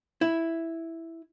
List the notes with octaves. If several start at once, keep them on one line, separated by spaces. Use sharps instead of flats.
E4